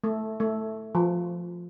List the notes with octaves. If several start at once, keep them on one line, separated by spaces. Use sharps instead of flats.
A3
A3
F3